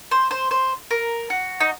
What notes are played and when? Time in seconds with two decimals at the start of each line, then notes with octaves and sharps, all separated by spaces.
0.11 C5
0.31 C5
0.51 C5
0.91 A#4
1.30 F#4
1.60 D#4